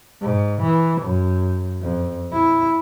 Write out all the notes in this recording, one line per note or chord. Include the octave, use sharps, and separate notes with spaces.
G#2
E3
F#2
F2
E4